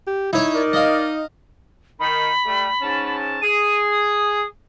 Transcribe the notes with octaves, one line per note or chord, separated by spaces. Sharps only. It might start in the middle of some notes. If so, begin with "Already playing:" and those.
G4
D#4 E4 C#5
A#4 D5
D#5 F5
D#3 B5
G3 A3
G#2 C#4 A5
G#4 D#7
D#6